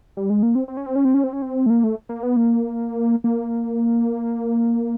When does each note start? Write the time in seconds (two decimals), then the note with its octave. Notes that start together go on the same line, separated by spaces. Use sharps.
0.17 G3
0.30 G#3
0.43 A#3
0.55 C4
0.68 C4
0.77 C#4
0.86 C4
0.96 C#4
1.05 C4
1.14 C#4
1.24 C4
1.33 C#4
1.42 C4
1.66 A3
1.70 A#3
1.84 A3
2.09 A#3
2.23 B3
2.36 A#3
3.24 A#3